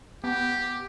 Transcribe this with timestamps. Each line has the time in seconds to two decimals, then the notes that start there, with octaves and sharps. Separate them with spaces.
0.24 B3 G4